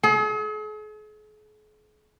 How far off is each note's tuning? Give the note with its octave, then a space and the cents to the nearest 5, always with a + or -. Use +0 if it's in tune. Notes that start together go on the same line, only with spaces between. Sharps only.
G#4 +45